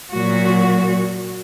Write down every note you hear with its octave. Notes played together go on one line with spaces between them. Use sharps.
A#2 F#3 F#4